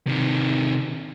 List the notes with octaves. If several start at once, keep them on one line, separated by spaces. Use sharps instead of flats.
C3 D#3